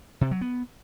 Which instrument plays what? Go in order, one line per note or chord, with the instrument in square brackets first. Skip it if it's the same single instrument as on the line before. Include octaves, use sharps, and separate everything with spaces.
[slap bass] C3
F#3
B3